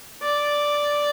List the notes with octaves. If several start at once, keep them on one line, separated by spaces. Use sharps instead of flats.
D5